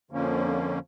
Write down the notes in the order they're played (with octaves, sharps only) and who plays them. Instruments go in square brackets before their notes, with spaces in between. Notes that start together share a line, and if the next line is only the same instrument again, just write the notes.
[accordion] F2 D3 F3 A#3 C#4